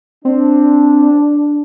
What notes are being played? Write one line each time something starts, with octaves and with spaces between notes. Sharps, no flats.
C4 D4